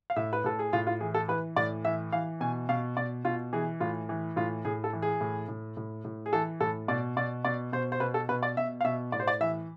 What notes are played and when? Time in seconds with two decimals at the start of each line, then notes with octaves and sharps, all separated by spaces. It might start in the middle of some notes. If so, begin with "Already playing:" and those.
0.10 F5
0.16 A2 E5
0.33 B4
0.44 A2 A4
0.59 G#4
0.73 A2 F4
0.87 F4
1.00 E3 G#4
1.14 A4
1.28 E3 B4
1.56 A2 D5
1.85 E3 E5
2.12 E3 F5
2.41 B2 G#5
2.69 B2 F5
2.97 B2 D5
3.25 B2 F4
3.53 E3 G#4
3.80 A2 F4
4.09 E3
4.36 A2 F4
4.65 A2 G#4
4.84 A4
4.93 E3
5.02 G#4
5.21 A2
5.48 A2
5.77 A2
6.04 A2
6.26 G#4
6.33 E3 A4
6.60 A2 A4
6.88 B2 D5
7.17 B2 D5
7.45 B2 D5
7.72 B2 C5
7.92 C5
8.00 B2 B4
8.14 A4
8.29 B2 B4
8.43 D5
8.57 B2 E5
8.81 F5
8.84 B2 E5
9.12 A2 D5
9.20 C5
9.27 D5
9.40 E3 E5